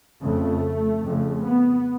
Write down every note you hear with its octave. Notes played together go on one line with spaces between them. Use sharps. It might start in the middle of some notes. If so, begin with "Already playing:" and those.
F2 C#3 A3
F2 C#3
B3